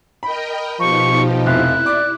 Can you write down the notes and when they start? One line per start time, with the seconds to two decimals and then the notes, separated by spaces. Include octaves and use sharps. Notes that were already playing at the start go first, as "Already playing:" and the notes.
0.23 A#4 D#5 G5 B5
0.80 B2 F3 D#4 G4 C#6
1.46 F1 E4 E5 F5 F#6
1.86 D5 D6